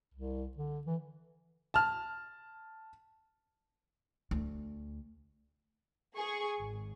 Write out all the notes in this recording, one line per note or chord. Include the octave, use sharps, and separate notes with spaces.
C2
D3
E3
A5 F6
D2
G#4 C#6
G#1